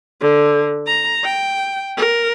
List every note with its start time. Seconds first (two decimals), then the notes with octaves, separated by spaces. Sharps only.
0.21 D3
0.87 A#5
1.24 G5
1.97 A#4